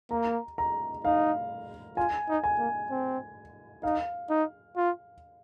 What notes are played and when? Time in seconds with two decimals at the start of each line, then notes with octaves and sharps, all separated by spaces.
0.11 A#3 A#5
0.58 A#5
1.04 D#4 F5
1.97 F4 G#5
2.29 D#4
2.44 G#5
2.59 A#3
2.90 C4
3.83 D#4 F5
4.29 D#4
4.76 F4